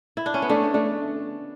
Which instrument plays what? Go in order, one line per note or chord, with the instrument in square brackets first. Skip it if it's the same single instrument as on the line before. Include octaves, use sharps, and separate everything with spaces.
[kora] E4
D4
C#4
B3
[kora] A3 [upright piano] D4
[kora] A3 [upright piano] D4